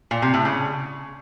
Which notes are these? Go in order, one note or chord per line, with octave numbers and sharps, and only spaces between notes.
A#2
C3
A2
C#3